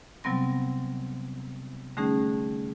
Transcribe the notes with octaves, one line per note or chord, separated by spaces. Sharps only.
C3 F#3 G3 B3 C4 A#6
D3 G3 A3 C#4 D#4 G#4